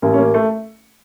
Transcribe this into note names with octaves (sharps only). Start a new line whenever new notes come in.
A1 A#3
C#4
A#3
A3